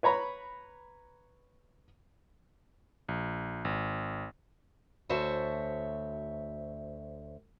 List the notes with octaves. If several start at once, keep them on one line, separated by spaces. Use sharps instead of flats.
B4 C#5 A#5 B5
A#1
G#1
D2 F#4 C5 C#5 E5 A5